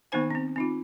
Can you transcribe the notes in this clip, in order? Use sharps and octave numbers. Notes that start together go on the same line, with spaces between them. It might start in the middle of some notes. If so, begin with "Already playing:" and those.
D#3 A#3 B3 D#4 C5 G#5
C4 C#4
C4 D#4 F4